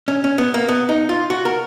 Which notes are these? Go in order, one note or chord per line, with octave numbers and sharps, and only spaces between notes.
C#4
C#4
B3
A#3
B3
D#4
F4
F#4
A#4